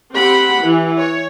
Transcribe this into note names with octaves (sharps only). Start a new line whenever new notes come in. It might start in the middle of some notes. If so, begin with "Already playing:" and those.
C4 G4 F#5 B5
E3
C#5